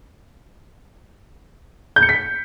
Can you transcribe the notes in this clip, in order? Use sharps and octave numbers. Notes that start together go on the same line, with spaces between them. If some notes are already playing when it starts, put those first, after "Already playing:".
G6
C#7
B6